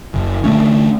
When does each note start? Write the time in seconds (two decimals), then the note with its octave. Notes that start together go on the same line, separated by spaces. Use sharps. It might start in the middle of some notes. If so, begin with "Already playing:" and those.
0.14 F#1
0.44 D3 A3 C#4